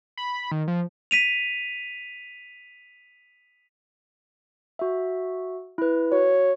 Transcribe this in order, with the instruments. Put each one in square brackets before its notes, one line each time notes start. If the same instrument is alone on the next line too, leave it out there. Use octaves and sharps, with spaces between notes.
[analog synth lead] B5
D#3
F3
[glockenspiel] B6 D#7 F7
[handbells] F#4 E5
E4 B4
[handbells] F#4 [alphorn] C#5